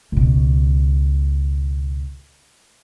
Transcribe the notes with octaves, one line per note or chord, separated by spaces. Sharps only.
C#2 B2